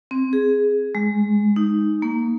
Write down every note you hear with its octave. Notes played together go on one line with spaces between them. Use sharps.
C4
G#4
G#3
D#4
A#3